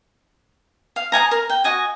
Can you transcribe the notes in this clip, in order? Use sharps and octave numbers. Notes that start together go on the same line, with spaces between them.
F5
D#5 F#5 G#5 A#5
A#4
G5
F#4 D#5 G#5